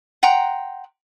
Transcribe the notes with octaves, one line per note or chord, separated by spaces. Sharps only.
F#5 G5 A#5 C6